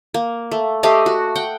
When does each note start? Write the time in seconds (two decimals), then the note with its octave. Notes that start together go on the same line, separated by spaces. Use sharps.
0.14 A#3
0.52 A3
0.83 A3 G4 D#5 F5
1.06 F#4
1.35 F#5 G5